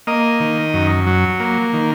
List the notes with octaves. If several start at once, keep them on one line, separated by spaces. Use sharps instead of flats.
A#3 D#5
D#3
F#2
F#3
A#3
D#3